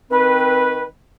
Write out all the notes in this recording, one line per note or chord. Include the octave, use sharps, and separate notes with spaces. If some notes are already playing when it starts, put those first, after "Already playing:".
D#3 C4 B4